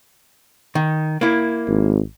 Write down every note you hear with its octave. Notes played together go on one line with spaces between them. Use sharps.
D#3
A#3 E4
G#1